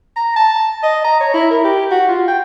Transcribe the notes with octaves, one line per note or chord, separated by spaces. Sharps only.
A#5
A5
D#5
A#5
C#5
E4
A#4
G4
F#4
F4
G5